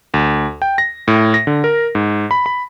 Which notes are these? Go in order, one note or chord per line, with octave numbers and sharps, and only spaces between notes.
D2
G5
A#6
A2
A#6
D3
A#4
G#2
B5
B5